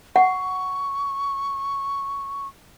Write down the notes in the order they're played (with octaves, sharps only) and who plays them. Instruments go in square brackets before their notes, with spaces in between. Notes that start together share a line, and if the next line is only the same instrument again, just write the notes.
[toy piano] F#5 [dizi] C#6